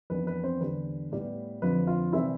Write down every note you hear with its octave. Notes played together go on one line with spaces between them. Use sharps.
F2 E3 B3 D4 B4
B4
C4 C5
E2 D3 G3 B4
A2 G3 B3
F2 D3 F3 C4 B4
F4 F5
C3 E3 G3 C4 E4 E5